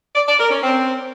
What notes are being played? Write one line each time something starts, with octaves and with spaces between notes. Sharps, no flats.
D5
D5
A#4
C#4
C4